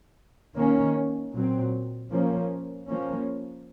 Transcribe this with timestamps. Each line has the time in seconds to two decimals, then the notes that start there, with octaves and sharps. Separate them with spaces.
0.56 D#3 A#3 C#4
1.33 A#2 F#3 C4
2.10 F3 A#3 C#4
2.88 F3 A#3 C#4